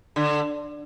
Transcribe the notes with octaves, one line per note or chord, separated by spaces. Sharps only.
D3